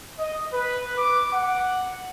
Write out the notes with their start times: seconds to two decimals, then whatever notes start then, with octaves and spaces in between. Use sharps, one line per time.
0.19 D#5
0.53 B4
0.98 D6
1.33 F#5